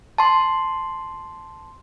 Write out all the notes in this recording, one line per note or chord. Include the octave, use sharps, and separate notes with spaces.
A5 C6